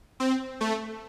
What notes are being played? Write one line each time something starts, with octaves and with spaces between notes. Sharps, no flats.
C4
A3